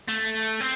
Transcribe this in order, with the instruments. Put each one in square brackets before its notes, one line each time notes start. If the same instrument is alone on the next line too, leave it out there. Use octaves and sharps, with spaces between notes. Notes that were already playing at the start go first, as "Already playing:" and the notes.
[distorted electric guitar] A3
C4